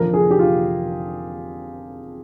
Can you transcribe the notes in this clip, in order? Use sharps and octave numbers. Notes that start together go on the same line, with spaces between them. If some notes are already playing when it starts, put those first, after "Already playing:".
Already playing: F1 F2 D3 F3 A#4
G#4
G4
F4